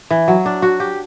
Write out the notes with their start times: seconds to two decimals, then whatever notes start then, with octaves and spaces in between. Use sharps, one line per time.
0.10 E3
0.28 F#3
0.46 D4
0.62 F#4
0.80 G4